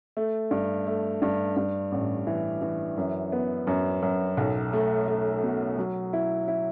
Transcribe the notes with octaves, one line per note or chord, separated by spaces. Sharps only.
A3
G2
A3
G2
G2
A1
E3
E3
F#2
B3
F#2
F#2
B1
A3
A3
B2
F#3
E4
E4